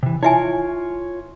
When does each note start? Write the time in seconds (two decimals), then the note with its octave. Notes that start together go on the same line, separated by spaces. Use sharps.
0.03 C3 E3
0.23 E4 F4 C#5 E5 G#5